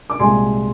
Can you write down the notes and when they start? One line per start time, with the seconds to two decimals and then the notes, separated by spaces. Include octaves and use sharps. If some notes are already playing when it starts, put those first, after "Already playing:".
0.10 D6
0.19 C2 A#2 G#3 G#5 C6